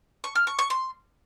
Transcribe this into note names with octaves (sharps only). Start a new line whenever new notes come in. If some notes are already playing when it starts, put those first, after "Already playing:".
C#6
F6
C#6
C#6
C6